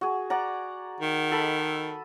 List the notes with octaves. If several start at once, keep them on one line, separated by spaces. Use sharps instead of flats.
F#4 G#4
D5 F#5 A#5
D#3
A4 D#5 B5